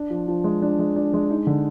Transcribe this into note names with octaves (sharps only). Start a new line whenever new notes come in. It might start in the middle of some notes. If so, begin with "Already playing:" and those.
Already playing: D4
F3
F3
G#3
D4
G#3
D4
G#3
D#4
D3